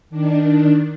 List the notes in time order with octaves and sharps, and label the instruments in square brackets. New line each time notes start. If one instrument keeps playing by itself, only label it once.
[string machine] D#3 D4